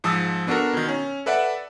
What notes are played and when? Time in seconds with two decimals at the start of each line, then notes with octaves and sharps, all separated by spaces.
0.04 G#2 F3 A5 D#6 E6
0.47 B3 D4 F#4 A4 A#4
0.73 B2 D#3
0.88 C#4
1.26 A4 B4 D5 E5 F#5